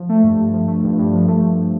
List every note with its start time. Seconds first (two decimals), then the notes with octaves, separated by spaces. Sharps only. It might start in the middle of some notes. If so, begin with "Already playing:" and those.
Already playing: F3
0.09 A3
0.23 G2
0.39 G2
0.53 F3
0.68 A3
0.84 G2
0.99 G2
1.13 F3
1.28 A3
1.43 G2